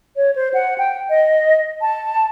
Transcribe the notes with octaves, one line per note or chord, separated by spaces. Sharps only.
C#5
C5
F#5
G5
D#5
A5